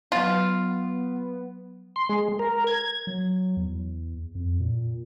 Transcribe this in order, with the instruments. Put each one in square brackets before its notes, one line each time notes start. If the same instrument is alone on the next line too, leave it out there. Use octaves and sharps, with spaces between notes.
[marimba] F#3 F5 [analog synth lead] B3 [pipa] F4
[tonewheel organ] C6
G#3
A#4
G#6
[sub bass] F#3
E2
F2
A#2